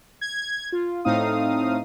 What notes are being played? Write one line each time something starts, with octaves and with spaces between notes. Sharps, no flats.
G#6
F4
A2 A3 C4 D#4 F5 D#6